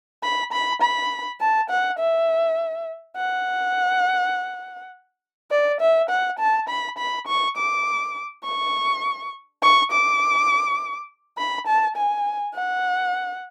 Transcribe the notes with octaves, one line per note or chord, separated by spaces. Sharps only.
B5
B5
B5
A5
F#5
E5
F#5
D5
E5
F#5
A5
B5
B5
C#6
D6
C#6
C#6
D6
B5
A5
G#5
F#5